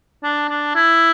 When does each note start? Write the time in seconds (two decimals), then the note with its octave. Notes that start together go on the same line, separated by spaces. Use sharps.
0.23 D4
0.49 D4
0.75 E4